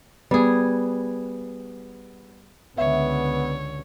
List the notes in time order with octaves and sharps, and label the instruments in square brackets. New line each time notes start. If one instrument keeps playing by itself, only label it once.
[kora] G3 G#4 [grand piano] B3
[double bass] C#2 D3 [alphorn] B3 [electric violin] C#5 [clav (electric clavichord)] E5